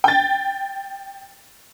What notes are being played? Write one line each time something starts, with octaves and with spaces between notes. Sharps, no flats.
G5 A6